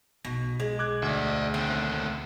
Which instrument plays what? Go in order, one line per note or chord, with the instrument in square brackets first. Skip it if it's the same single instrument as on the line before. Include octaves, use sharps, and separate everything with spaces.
[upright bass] B1 [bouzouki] B2
[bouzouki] G#3
[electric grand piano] D6 F#6 G#6
[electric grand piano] D2 [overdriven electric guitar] D5 E5
[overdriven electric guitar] D#2 D3 [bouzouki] C4